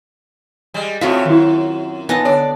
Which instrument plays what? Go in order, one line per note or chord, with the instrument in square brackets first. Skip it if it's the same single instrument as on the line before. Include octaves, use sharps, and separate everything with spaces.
[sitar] G3 G#3
[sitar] A2 C#3 C#4 [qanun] C4 F#4 E5 [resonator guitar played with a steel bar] F4
[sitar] F#2 [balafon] D#3 E4
[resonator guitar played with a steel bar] A#2 D#4 G#5 [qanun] B3 D#5 A5
[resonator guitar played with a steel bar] D3 [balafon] C#5 [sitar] D5